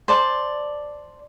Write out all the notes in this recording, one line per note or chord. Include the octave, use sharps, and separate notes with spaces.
C5 D5 A5